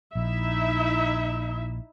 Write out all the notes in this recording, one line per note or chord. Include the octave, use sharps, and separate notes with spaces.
A#1 D#4 E4 E5